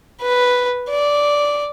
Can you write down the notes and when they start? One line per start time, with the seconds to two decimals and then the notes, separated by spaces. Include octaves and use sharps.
0.22 B4
0.90 D5